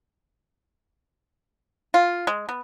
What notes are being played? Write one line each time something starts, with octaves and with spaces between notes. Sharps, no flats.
F4
G#3
B3